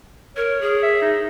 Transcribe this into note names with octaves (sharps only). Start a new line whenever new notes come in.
A#4 C#5
G#4
E5
D#4